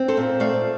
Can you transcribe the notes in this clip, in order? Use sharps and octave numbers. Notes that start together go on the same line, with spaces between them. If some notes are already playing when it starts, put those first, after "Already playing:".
Already playing: C4
A4 C5
A#2
A3 D5 F5